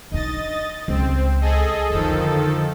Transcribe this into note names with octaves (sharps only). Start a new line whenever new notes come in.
D4 D#4 D#5 A6
C#2 C4
G#4 A4 D#5
F2 D3 D#3 F3 A4